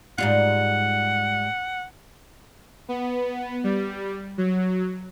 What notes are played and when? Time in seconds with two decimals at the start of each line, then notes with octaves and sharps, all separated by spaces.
0.18 G#2 G3 F4 F#5
2.89 B3
3.64 G3
4.38 F#3